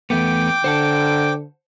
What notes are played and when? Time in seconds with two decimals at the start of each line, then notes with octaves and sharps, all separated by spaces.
0.10 E2 A3 B3 G5 D6
0.64 D3 C5 F#5 A5